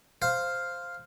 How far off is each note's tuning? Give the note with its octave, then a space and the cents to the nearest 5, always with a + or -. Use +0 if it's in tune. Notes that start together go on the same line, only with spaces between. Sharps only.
C5 +0 F5 +0